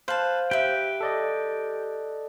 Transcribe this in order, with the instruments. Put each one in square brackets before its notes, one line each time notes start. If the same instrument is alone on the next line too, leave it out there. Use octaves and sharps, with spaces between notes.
[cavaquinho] B4 A5 [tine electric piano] C5 F5
[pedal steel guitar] G4 G5 [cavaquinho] B4 E5
[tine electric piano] A4 D5 D#5